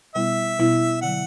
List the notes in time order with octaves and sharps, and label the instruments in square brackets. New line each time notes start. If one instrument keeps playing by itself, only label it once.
[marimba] B2 G3 B3 E4 [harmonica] E5
[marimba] B2 G3 B3 E4
[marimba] D3 F#3 [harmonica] F#5